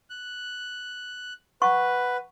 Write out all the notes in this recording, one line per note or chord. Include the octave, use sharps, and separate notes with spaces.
F#6
B4 F#5 C#6